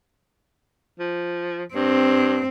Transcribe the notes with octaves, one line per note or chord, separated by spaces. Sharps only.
F3
G2 C4